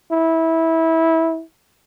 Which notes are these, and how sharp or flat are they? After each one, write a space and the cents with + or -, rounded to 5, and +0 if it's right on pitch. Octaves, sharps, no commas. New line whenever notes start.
E4 -20